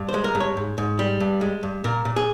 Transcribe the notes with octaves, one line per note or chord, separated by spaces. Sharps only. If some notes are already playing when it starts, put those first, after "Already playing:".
Already playing: G2
C5
G#3
A#4
G2
C#5
G#2
G#2
G3
G2
G#3
G2
A#2 A#4
A#2
G#4